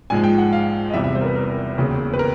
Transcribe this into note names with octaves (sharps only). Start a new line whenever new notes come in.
A#1 G#2 F3 G#3 G#5
G5
F#5
F5
D#5
E2 C3 E3 G3 E5
E5
C5
A#4
B4
A#4
E1 D#2 C#3
B4
A#4